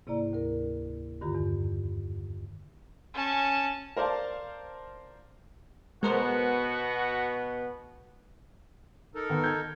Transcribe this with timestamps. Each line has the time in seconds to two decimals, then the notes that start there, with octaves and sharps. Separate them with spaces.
0.07 G#2 C3 A#3 E4 D5 A#5
0.33 D2 A#4
1.21 G2 D3 D#3 F4 A#5
1.35 E2
3.14 C#4 A5
3.97 A#4 C5 D5 F5 A5
6.03 B2 G#3 B3 F#4 A#4 C5
9.15 D#4 A4 A#4
9.30 D#3 B3
9.44 G6 G#6